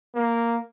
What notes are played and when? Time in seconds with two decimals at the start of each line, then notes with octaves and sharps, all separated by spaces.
0.15 A#3